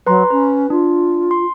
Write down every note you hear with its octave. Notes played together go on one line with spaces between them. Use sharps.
F#3 B4 A#5 C6
C#4 B4
D4 F4
C6